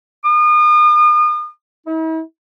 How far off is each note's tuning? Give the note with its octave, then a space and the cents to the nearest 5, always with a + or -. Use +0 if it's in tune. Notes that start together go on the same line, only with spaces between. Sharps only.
D#6 -40
E4 -45